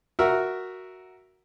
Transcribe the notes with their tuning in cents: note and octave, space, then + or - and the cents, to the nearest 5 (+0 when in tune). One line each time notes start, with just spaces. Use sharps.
F#4 +0 A#4 +0 E5 +0